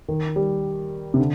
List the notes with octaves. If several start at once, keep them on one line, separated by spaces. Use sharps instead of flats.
D#3
G3
C3
D3